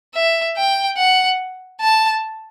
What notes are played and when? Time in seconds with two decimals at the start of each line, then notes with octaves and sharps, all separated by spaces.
0.15 E5
0.57 G5
0.98 F#5
1.80 A5